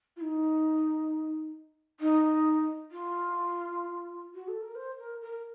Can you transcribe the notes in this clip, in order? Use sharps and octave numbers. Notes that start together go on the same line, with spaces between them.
F4
D#4
D#4
F4
F#4
A4
A#4
C5
A#4
A#4